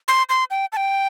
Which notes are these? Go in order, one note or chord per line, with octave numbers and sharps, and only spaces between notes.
C6
C6
G5
A5
G5